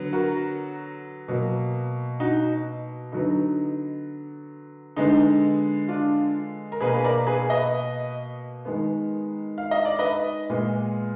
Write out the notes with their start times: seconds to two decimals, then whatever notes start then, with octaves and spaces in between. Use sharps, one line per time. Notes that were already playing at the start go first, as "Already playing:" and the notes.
Already playing: D3 F#3 B3
0.13 F#4 A#4
1.28 B2 F#3 A#3
2.20 D#4 F#4
3.12 D3 F#3 B3 D#4
4.96 D3 G#3 B3 D#4
5.88 D4 F4
6.72 A#4
6.81 B2 A#3 G#4 B4
6.94 B4
7.04 A#4 D5
7.27 G#4 B4
7.50 B4 D#5
8.65 D#3 G#3 B3
9.58 F5
9.71 D#5
9.85 D5
9.99 B4 D#5
10.50 A#2 G#3 B3